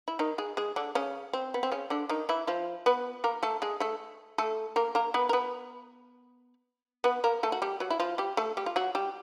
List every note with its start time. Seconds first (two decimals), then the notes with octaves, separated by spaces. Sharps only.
0.08 E4
0.19 D#3 D#4
0.38 G#3 G#4
0.57 G#3 G#4
0.76 D3 D4
0.95 C#3 C#4
1.33 C4
1.54 B3
1.63 C4
1.72 C#3 C#4
1.90 D3 D4
2.09 D#3 D#4
2.29 E3 E4
2.47 F3 F4
2.86 B3 B4
3.24 A#3 A#4
3.43 A3 A4
3.62 G#3 G#4
3.80 A3 A4
4.38 A3 A4
4.76 A#3 A#4
4.95 A#3 A#4
5.14 B3 B4
5.29 A#4
5.33 B3 B4
7.04 B3 B4
7.24 A#3 A#4
7.43 A3 A4
7.52 F#4
7.62 G3 G4
7.80 F#3 F#4
7.90 E4
8.00 F3 F4
8.18 G3 G4
8.37 A3 A4
8.57 G3 G4
8.66 F4
8.76 F#3 F#4
8.95 G3 G4